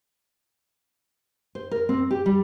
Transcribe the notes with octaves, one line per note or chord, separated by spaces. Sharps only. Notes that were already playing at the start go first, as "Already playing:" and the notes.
C5
A#4
C4
G4
G3